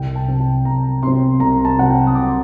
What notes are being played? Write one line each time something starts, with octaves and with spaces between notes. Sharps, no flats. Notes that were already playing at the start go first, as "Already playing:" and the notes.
Already playing: C2 G5
A5
C3 F#3 C4
A5
C2 A#5
C3 F#3 C4 C6
C2 A#5
A5
C3 F#3 C4 F#5
G5
D#6
C2 D6
C6